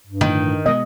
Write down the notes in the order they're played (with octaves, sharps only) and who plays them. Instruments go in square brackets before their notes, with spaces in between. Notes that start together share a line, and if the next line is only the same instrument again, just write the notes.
[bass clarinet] G2
[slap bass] A2 D3 F3 [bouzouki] D#3
[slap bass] B2 G#3 B3 [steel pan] D#5